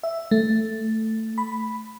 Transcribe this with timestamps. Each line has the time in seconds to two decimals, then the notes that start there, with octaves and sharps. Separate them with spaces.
0.03 E5
0.31 A3
1.38 B5